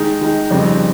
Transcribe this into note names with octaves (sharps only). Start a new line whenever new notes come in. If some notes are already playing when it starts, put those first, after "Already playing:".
Already playing: D#3 G#3 D#4
D#3 G#3 D#4
F2 C#3 G3 C4 D#4